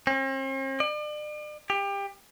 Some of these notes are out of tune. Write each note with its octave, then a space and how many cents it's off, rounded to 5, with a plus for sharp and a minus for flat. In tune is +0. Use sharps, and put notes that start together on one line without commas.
C4 +45
D5 +40
G4 +25